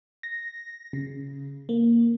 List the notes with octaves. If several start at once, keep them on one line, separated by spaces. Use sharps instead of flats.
A#6
C#3
A#3